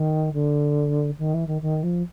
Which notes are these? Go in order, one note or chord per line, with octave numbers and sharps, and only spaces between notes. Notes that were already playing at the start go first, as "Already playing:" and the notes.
Already playing: D#3
D3
D#3
E3
D#3
D#3
F3